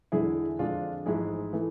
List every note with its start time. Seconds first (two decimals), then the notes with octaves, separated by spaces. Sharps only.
0.12 E2 D3 G#3 E4 G#4
0.59 F2 D3 G#3 D4 F4
1.05 A1 G#2 F3 G#3 E4 G#4
1.53 E3 A3